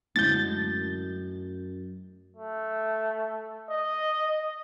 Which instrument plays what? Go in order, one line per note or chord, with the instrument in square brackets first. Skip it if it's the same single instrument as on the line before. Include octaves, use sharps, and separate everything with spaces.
[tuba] F#2 [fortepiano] A2 D3 G#3 [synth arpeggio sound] G6 A6
[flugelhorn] A3
D#5